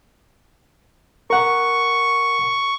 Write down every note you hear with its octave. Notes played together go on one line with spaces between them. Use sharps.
A#4 F#5 C#6